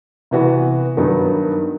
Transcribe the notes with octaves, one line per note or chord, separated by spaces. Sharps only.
C3 E3 B3 F#4 B4
G2 D#3 F#3 B3 D#4